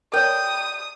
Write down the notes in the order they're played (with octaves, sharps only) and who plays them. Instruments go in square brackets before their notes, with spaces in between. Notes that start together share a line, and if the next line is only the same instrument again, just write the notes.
[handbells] A#4 C#5 [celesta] D5 G6 [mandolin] G5 [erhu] D#6